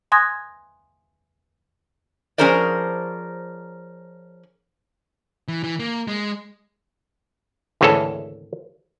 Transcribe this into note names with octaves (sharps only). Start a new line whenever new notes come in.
G#5 C6 D#6 F#6 G#6 A#6
F3 C#4 G#4 A#4 C5 D5
E3
E3
A#3
G#3
G#1 D2 C#3 E3 C#4 A4